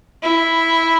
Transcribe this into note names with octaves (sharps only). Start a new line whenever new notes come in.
E4